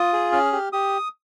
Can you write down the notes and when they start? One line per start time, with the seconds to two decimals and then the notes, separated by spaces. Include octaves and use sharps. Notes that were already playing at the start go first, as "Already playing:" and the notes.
Already playing: F4 D#6
0.13 G#4
0.32 C#4 F6
0.53 G4
0.73 G4 D#6